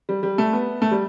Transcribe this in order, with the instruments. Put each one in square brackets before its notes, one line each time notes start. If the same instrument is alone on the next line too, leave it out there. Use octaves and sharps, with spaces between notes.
[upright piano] G3
G3
A3
B3
A3
G3